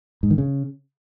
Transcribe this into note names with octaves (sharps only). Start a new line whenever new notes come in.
G#2
D#3
C#3